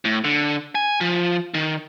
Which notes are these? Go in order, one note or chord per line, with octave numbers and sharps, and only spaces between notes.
A2
D3
G#5
F3
D#3